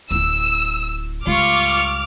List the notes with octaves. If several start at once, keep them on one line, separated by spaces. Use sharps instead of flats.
D1 E4 E6
C#2 G2 F4 C#6 D6 F6